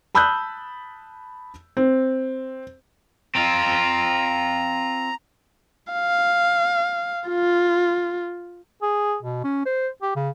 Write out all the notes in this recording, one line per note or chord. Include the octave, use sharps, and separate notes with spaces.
A5 B5 D#6 E6 F#6 G6
C4
C4 F4 A#5
F5
F4
G#4
B2
C#4
C5
G4
C#3